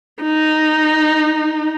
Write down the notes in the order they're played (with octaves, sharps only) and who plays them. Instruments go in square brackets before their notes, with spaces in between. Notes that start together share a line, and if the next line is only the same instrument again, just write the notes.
[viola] D#4